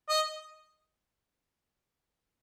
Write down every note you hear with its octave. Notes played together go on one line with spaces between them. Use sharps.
D#5